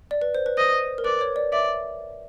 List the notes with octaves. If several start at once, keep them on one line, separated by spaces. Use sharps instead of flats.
D5
B4
C5
B4
C5 D#5
A#4
B4 D5
C#5
D5
D5 E5